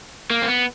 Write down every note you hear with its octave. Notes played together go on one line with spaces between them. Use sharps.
A#3
C4
B3